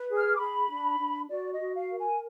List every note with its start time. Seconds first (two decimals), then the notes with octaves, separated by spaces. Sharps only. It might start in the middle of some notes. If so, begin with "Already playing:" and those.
Already playing: B4
0.09 G#4
0.17 F6
0.35 D6
0.39 G#4 B5
0.69 D4
0.99 D4
1.30 F#4 D5
1.52 D#5
1.60 F#4
1.75 F5
1.90 A#4
1.98 G#5